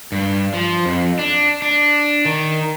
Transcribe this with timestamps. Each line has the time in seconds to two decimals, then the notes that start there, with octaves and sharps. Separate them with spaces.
0.12 G2
0.54 F3
0.86 F2
1.19 D4
1.62 D4
2.25 D#3